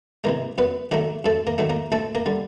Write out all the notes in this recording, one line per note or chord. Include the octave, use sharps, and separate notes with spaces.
C3 E3 G#3 A#3 A#4
F#2 B3 B4
D#3 F#3 A3 A#3 A#4
F#2 A3 A4
A#3 A#4
D#3 F#3 A3
A#3 A#4
D2 A3 A4
A#3 A#4
D3 G3